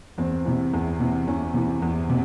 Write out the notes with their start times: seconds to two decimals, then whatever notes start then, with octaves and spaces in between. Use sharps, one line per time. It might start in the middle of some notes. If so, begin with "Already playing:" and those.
0.18 E2 C4
0.45 C3 E3
0.73 E2
1.00 C3 E3
1.27 E2 C#4
1.54 C3 E3
1.82 E2
2.09 C3